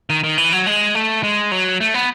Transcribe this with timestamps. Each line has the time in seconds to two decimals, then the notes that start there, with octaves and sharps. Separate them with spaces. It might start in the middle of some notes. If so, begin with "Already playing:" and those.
0.10 D#3
0.24 D#3
0.38 E3
0.52 F#3
0.67 G#3
0.95 A3
1.23 G#3
1.52 F#3
1.81 A3
1.94 B3